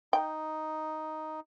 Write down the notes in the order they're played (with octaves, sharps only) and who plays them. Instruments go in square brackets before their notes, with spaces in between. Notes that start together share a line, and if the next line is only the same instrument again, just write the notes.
[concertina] D#4 [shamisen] G5